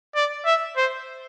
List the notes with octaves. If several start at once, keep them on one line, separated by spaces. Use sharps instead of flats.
D5
E5
C5